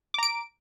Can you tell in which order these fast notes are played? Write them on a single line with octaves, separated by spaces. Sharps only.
D6 A#5 D7